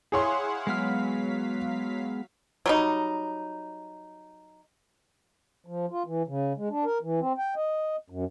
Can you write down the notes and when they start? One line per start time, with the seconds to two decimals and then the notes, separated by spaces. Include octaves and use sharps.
0.12 E4 G#4 C#5 F5 F#5 C6
0.67 F#3 G#3 B3 F5 F6 B6
2.66 F#3 G3 D#4
5.66 F3
5.91 F4
6.06 E3
6.28 C#3
6.57 G#3
6.70 D4
6.85 A#4
7.02 E3
7.20 C4
7.38 G5
7.56 D#5
8.10 F#2